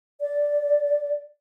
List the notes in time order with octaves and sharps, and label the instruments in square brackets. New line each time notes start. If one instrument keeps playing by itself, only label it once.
[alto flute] D5